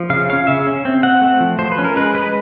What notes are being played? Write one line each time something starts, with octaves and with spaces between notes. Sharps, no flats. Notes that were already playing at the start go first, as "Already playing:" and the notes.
Already playing: F3
C#3 F5
C#4 F5
C#3 E5
C#4
C4
C4 F#5
A3
F3
F3 C5
B4
C#4
A#4
G#3 B4
G#3 B4